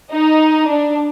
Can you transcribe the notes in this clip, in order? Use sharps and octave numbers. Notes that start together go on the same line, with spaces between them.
D#4
D4